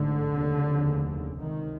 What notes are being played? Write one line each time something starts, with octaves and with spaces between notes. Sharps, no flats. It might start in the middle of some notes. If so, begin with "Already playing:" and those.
Already playing: A1 G#2 D3
F1 D#2 C#3
C#2 C3 D#3